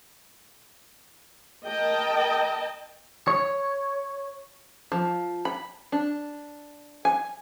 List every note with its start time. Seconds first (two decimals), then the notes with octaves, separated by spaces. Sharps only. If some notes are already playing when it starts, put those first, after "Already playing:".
1.66 A#4 D#5 G5 A5
3.28 C#5
4.92 F3
5.45 B5
5.92 D4
7.05 G#5